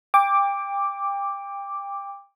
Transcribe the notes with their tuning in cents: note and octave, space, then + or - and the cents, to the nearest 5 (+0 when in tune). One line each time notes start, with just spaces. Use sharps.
G5 +30 D6 +0